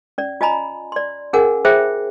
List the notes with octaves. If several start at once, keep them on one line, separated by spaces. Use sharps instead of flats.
C#4 D5
F4 D#5 G#5 A#5 B5
D5 C6
C#4 G#4 A#4 F#5 G#5
F4 G#4 C5 E5 G5